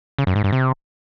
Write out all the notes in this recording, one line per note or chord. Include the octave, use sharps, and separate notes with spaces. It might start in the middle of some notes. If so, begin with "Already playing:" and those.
C#3
F#2
G#2
G2
C3